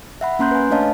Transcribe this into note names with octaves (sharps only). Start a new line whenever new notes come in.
E5 F#5 B5
A#3 C#4 A#5 C6 F#6 G6
B4 G#5
A3 D4 C#5 D#5 F5 A5